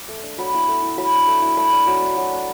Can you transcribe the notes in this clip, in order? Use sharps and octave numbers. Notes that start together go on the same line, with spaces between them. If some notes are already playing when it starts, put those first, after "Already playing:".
Already playing: D6
A3
D4
F#3 B5
B3 E4
A3
E4
F#3 B5
D4
A3
E4
A3 B5
D4
F#3
D4
F#3
D4